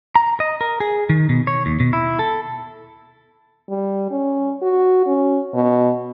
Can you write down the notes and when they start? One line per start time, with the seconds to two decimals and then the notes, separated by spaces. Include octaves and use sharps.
0.15 A#5
0.40 D#5
0.61 A#4
0.80 G#4
1.09 D#3
1.29 B2
1.47 C#5
1.66 D#2
1.80 B2
1.93 E4
2.19 A4
3.70 G3
4.11 C#4
4.62 F#4
5.06 C#4
5.54 B2